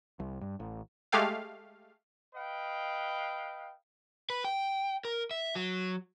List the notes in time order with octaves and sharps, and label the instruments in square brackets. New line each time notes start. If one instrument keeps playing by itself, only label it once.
[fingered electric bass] C2
G2
A1
[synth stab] G#3 A3 G4 F5
[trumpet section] B4 D#5 F5 G5
[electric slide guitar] B4
G5
A#4
E5
F#3